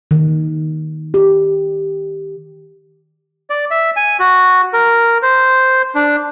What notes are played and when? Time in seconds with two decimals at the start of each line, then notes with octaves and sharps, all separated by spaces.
0.11 D#3
1.14 G4
3.50 D5
3.71 E5
3.96 G#5
4.20 F#4
4.73 A#4
5.23 C5
5.95 D4